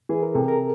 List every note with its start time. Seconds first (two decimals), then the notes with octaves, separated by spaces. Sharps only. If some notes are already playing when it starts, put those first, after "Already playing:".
0.09 E3 G#4
0.23 A#4
0.35 C3 A4
0.48 A#4